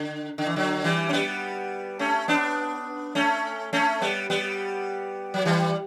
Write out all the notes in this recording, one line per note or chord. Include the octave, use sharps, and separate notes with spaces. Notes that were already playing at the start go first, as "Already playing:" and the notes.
Already playing: D3
D3
E3
D3 F#3
E3 G3
C#4
G3 B3
A3 C#4
B3 D4
A3 C#4
A3 C#4
G3 B3
G3 B3
F#3
E3 G3